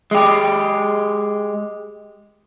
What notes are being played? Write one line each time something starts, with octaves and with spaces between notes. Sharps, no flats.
G#3 G4